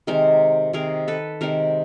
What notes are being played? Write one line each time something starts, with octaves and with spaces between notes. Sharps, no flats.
C3 D#3 G#3 A#4 C5
C3 D#3 G#3 G#4 A#4
A4 B4
C3 D#3 G#3 A#4 C5